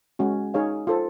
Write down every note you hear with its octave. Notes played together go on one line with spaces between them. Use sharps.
G#3 C#4 F#4
D#4 G#4 C#5 F5
F4 A4 C5